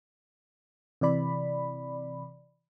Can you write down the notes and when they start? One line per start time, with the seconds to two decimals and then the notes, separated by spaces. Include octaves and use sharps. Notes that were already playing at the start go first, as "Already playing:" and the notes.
1.01 C3 E3 D5 B5